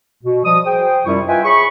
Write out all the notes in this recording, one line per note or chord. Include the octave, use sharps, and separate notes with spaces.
B2
F3 G3 D#5 D#6
G#4 C5 G5
F#2 C3 G3 E4 F4 C#6
F4 B4 D#5 E5 G5 G#5
G#4 C#5 B5 C#6